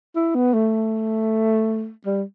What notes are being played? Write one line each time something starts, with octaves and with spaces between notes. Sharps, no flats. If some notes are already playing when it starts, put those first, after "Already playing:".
E4
B3
A3
G3